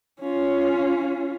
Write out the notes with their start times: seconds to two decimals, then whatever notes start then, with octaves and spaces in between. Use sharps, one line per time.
0.21 C#4 F4